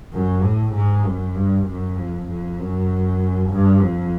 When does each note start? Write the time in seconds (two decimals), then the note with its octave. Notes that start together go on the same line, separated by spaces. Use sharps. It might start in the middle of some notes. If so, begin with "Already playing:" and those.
0.13 F#2
0.44 A2
0.75 G#2
1.06 F#2
1.35 G2
1.66 F#2
1.97 F2
2.28 F2
2.59 F#2
3.50 G2
3.81 F2